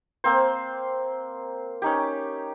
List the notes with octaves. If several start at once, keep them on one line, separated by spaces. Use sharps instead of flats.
A#3 C4 C5
C#4 D#4 G4